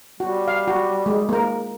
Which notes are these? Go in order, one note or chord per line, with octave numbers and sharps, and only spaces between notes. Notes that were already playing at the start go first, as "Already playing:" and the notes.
G3 F#4
F5
F#4
G#3
A#3 A#4